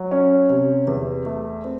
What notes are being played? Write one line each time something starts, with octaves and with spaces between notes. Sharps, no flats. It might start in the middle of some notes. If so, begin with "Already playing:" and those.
Already playing: F#3
C#4
C3
E2
A3
C4